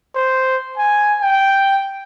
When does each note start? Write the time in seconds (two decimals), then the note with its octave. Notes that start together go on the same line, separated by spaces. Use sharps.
0.15 C5
0.78 G#5
1.21 G5